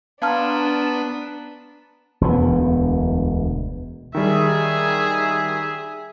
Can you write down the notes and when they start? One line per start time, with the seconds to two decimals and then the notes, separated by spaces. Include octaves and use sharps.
0.22 B3 D4 F5 A5 A#5 C6 F6 G#6
2.21 E1 D2 B3
4.15 D#3 G3 G#4 E5